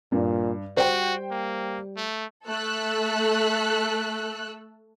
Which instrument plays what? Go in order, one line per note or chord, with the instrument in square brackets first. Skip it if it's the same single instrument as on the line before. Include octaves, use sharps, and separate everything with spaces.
[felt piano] G2 [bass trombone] A#2
[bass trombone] G3 [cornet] F#4 [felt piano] C5 G5
[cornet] A#3
A3
[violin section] A3 A4 E6 F#6